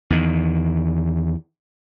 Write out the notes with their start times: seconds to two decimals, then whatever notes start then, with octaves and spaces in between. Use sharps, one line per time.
0.10 E2 D#3